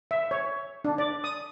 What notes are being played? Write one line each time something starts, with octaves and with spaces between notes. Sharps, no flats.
E5
C#5
D4
D5
D#6